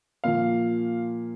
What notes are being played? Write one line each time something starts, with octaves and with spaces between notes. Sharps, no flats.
A#2 F3 F5